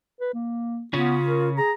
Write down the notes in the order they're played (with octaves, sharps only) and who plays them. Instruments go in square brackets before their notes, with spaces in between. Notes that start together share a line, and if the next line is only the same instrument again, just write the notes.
[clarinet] B4
A#3
[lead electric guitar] C#3 C#4 [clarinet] B3 [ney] F4
[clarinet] A#4
[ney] G#4 [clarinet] A#5